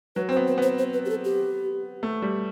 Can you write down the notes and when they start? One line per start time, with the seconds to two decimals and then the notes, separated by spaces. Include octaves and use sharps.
0.16 F#3 B4
0.29 C4
0.32 C5
0.36 B3
0.48 B4
0.58 B3 C5
0.79 C5
0.93 B4
1.05 G4
1.10 A4
1.25 G4
2.03 A3
2.22 G3